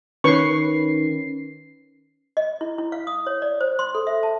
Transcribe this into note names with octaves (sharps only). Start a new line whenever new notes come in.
D#3 C#4 B4 C#6 C7
D#5
E4
E4
F5
D#6
C#5
D5
C5
C6
A4
E5
A5